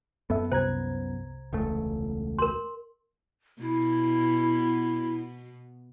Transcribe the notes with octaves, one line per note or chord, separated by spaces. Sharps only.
F#2 B3 A4 E5
C2 C5 A#5 G#6
E1 C#2 A3
A#4 C6
B2 B3 E4